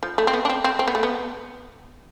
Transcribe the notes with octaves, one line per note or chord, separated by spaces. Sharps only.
F3
A3
C4
B3
D4
C4
C4
C4
B3
A3
B3